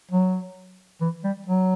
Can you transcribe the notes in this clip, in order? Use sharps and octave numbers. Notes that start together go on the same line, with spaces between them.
F#3
E3
G3
F#3